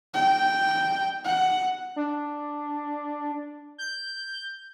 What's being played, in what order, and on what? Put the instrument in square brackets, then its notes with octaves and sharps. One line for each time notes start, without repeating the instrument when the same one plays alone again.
[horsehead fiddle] G5
F#5
[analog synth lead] D4
G6